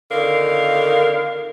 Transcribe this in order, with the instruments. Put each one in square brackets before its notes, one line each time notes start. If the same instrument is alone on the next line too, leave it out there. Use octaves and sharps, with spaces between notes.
[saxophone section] F2 D3 D#3 A#4 F5